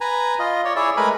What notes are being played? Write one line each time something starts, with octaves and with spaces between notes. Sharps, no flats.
B4 G#5 A#5
F4 D#5
C#5 D5
E4 G#4 C#5 D5 E5
G#3 A3 A#4 B4 G#5 B5